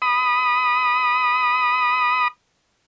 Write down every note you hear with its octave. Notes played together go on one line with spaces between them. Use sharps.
B5 D#6